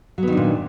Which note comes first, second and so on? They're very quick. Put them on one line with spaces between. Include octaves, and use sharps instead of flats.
F#3 B3 D#3 D4 A#2